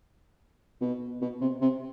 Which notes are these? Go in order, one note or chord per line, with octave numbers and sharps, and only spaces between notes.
B2
B2
C3
C3